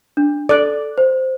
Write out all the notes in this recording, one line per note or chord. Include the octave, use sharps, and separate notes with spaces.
D4
A4 D5 F#6
C5